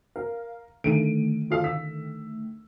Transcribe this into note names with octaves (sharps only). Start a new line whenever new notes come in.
A#4 F5
D3 D#3 A3 D7 D#7
F4 A4 F5
E6 B6